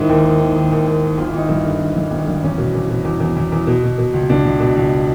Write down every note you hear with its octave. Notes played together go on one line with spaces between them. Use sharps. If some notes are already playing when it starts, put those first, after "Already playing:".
Already playing: G#2 D#3 E4
D#2
D#3
D#3
D#3
D#2
D#2
D#3
G#1 F4
E4
G#1 D#4
G2 E4
D3
D3
G2
G#1
G2
E2 C#4
B2
E2
B2
E2
E2
E2
E2
B2
B2
B2
C#2
C#2 D4
C#2
B2
C#2